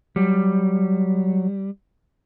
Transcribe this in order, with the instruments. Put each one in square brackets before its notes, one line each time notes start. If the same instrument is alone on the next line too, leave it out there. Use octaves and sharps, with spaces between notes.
[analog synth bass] F#3 [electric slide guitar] G3